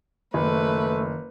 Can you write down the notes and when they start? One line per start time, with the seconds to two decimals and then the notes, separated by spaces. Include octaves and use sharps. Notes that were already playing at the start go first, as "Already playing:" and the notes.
0.34 F#1 D#3 A3 B4